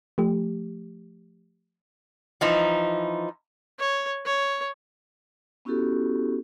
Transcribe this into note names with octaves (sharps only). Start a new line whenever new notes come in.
F3 A3 G4
E3 F3 D#4
C#5
C#5
B3 C#4 E4 F#4 G4 A4